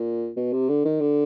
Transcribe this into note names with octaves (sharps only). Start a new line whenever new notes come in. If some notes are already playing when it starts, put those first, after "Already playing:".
Already playing: A#2
B2
C3
D3
D#3
D3